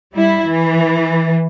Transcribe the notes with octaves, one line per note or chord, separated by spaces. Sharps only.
G3 E4
E3